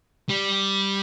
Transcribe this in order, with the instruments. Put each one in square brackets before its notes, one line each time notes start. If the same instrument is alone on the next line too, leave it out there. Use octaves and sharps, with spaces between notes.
[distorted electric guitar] G3